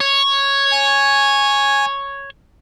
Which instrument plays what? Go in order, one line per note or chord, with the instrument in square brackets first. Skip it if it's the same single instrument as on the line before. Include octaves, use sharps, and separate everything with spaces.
[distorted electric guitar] C#5
[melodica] G#5